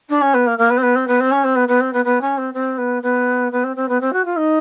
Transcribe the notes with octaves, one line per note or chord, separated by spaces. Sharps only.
D4
C#4
B3
A#3
A#3
B3
C4
B3
C4
B3
C4
C#4
C4
B3
B3
C4
B3
B3
C#4
C4
C4
B3
B3
B3
C4
C4
B3
C4
F#4
F4
D#4